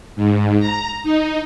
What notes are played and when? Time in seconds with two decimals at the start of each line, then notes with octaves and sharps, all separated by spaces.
0.16 G#2
0.59 A#5
1.03 D#4